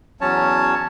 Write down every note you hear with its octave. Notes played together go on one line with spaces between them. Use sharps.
E2 F#3 C#4 C#5 A5